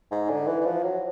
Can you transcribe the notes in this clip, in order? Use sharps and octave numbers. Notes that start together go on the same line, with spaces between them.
G#2
D3
E3
E3
F3
F#3